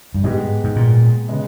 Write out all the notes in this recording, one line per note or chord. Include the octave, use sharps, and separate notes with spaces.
G2
G#2 G#3 B3 G4
G#2
A#2
C#3 G#3 B3